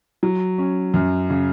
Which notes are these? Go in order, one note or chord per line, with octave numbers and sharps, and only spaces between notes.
F#3
C#4
F#2
C#3